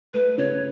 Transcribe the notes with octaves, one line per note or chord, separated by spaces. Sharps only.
A3 B4
C#3 C#5